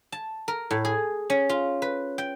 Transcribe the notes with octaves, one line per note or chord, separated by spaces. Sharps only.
A5
A#4
A2
G#4
C#4
F4
B4
G5